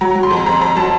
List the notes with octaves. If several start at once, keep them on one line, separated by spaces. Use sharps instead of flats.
F#3 A#5
F#3
C6
F2
F2 A#5
F2 A#5
F#3 A5